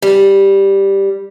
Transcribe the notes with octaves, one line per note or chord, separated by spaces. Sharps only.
G3